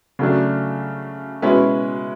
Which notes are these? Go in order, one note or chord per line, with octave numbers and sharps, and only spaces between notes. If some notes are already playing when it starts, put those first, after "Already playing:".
C#3 F#3 A3 D4
B2 G#3 C#4 E4 B4